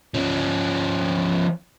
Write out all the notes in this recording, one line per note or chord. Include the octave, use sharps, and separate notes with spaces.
F3 C#4